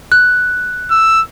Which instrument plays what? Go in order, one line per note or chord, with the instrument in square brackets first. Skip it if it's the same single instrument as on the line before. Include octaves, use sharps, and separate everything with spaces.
[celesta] F#6
[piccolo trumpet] E6